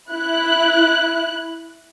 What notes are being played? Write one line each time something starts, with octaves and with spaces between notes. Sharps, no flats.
E4 F#6